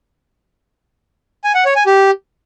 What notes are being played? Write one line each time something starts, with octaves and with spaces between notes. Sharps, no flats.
G#5
F#5
C#5
G#5
G4